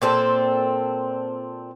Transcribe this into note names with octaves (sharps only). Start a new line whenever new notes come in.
A#2 C4 A4